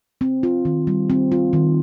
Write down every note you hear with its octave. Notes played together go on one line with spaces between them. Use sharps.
C4
F4
D#3
G3
C4
F4
D#3